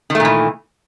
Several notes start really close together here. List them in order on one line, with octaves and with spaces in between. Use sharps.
D#3 A3 A#2 E3